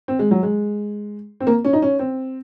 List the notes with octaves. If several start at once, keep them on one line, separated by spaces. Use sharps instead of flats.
C4
G#3
F#3
G#3
C4
A#3
C#4
D#4
C#4
C4